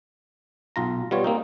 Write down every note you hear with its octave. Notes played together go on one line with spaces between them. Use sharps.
B1 F4 A#5
G3 B3 F4 C#5
A#3 C4 D#4